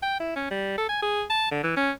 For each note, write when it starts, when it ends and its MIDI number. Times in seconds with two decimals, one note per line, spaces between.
0.02 0.17 79
0.20 0.33 64
0.36 0.50 61
0.51 0.73 55
0.78 0.85 69
0.89 0.98 80
1.02 1.23 68
1.30 1.47 81
1.51 1.63 50
1.63 1.75 52
1.77 1.91 61